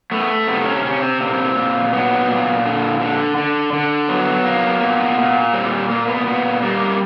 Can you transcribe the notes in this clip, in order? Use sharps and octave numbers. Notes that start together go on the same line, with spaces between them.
A3 B3
C3 B3
C#4
C3 C#4
C4
A#2 C4
A#2
F#3 B3
A#2
D3
D3
D3
D3
F#3 B3
A#3
A#2
A#2
G3 C4
A#2 A#3
B3
A#2 B3
G3 A#3